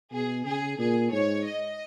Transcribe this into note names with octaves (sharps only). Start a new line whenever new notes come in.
B2 G#4
C#3 G#4
A#2 G#4
G#2 C#5
D#5